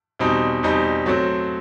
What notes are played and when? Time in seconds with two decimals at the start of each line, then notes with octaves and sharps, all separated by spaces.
0.19 E2 B2 G3 C4 D#4
0.63 E2 B2 G3 C4 D#4
1.06 F#3 A3 C4